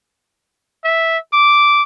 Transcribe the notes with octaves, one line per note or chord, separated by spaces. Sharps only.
E5
D6